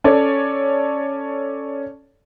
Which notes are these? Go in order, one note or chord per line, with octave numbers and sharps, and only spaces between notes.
C#4 A4 C#5 D5